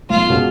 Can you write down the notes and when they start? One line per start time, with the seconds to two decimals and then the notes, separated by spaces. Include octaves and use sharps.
0.10 B1 F4
0.28 B2 G#3 C#4 F#4